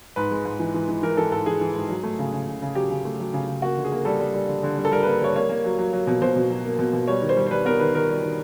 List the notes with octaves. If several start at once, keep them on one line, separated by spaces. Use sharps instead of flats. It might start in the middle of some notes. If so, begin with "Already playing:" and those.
G#2 B4
G#3
G#2
E3
E3
E3
E3 A#4
E3 A4
G#2 A4
E3 G#4
E3
G#2
F#3
A3
C#3
C#3
C#3
C#3
F#3 G4
C#3
A3
F#3
C#3
C#3
A#3 F#4
D3
G#4
A#3
G3 A4
G3
G3
D3
D3
G3
A4
G3 A#4
A#3 B4
G3 C#5
A#3 C#5
A#3
F#3
F#3
F#3
B2
B2 C5
B2
F#3
A#3
B2
B2
G3 C#5
D#3
C5
G3
C5
G3 B4
B3 A#4
D#3 B4
D#3 A#4
G3
D#3